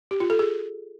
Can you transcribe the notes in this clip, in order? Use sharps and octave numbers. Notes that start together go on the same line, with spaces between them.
G4
F4
A4
G#4